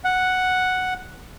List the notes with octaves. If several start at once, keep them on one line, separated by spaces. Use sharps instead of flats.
F#5